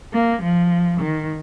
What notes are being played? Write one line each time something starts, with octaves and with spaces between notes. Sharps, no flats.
A#3
F3
D#3